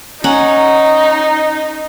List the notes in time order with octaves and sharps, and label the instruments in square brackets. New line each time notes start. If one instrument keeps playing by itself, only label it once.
[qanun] C#4 F#5 [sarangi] D#4 [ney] A#5